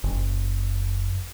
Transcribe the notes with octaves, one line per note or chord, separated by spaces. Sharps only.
F#1